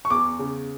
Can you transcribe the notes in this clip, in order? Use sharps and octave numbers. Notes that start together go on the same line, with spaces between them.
C#6
E2 D6
C#3